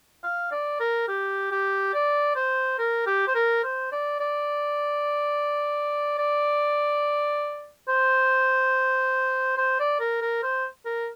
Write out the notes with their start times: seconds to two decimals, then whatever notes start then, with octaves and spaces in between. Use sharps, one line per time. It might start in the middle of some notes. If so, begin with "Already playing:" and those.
0.24 F5
0.52 D5
0.80 A#4
1.08 G4
1.51 G4
1.94 D5
2.36 C5
2.79 A#4
3.07 G4
3.28 C5
3.35 A#4
3.64 C5
3.92 D5
4.20 D5
6.18 D5
7.88 C5
9.58 C5
9.80 D5
10.00 A#4
10.22 A#4
10.43 C5
10.85 A#4